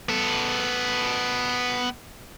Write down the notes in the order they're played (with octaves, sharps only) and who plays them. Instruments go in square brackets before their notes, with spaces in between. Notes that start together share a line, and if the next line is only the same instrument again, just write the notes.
[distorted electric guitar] B3 A4